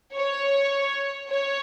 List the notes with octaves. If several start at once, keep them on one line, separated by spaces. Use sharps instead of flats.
C#5
C#5